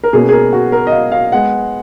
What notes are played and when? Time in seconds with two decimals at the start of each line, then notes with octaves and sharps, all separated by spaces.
0.03 A#4
0.13 B2 A#3 C#4 G#4
0.29 G#4
0.33 A#4
0.53 F#4
0.72 A#4
0.87 D#5
0.92 F5
1.12 F5
1.31 G#3 B3 F#5